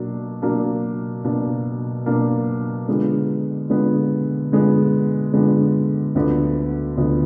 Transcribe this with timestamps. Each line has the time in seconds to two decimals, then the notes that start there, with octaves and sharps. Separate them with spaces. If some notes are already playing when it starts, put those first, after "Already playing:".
Already playing: B2 F#3 A#3 D4
0.42 B2 F#3 A#3 D4
1.24 B2 F#3 A#3 D4
2.06 B2 F#3 A#3 D4
2.88 D3 F3 G#3 B3
3.70 D3 F3 G#3 B3
4.52 D3 F3 G#3 B3
5.34 D3 F3 G#3 B3
6.15 D2 D3 F3 B3
6.97 D2 D3 F3 B3